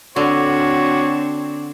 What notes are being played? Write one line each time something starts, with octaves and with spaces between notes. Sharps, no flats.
D3 C4 D4 F#4 C#5